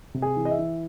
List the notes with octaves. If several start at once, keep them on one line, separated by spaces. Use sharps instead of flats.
C3
G#4
E3
D#5
E5
E3